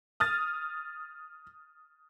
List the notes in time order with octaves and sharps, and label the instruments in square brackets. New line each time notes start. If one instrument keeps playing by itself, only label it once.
[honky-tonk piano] D#6 F6 A6